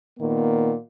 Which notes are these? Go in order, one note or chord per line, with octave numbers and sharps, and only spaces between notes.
A#2 D#3 A#3 B3